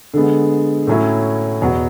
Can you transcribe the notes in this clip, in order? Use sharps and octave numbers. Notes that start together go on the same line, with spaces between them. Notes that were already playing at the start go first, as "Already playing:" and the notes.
D3 G#3 B3
A2 F#3 C#4 E4
E2 B2 F#3 B3 F#4